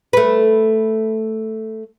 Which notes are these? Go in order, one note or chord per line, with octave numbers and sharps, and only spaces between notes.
A3 B4